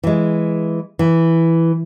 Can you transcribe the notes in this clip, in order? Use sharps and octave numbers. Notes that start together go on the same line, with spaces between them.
E3 G#3
E3